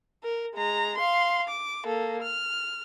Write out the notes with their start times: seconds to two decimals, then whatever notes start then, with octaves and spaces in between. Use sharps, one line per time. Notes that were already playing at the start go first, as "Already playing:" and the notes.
0.24 A#4
0.55 G#3 A#5
0.97 F5 C6
1.48 D6
1.85 A#3 A4
2.22 F6